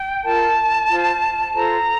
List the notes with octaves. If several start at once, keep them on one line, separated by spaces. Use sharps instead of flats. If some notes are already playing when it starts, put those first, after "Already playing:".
Already playing: G5
F4 A#4 A5
F4 C5
F4 A4 C5 A#5